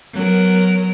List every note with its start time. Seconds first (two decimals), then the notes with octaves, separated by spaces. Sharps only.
0.14 F#3 B3 A#4